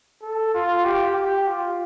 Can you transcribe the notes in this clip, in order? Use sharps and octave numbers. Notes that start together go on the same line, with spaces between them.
A4
F4
G4
G4
F4